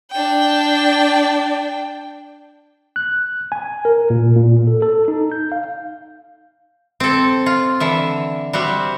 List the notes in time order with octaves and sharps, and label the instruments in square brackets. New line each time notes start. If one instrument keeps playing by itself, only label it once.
[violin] D4 G5
[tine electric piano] F#6
G#5
A#4
A#2
A#2
A4
A4
D#4
G6
F5
[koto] C4 A4
F4
D3 E3 E5
G3 F#4 C5 E5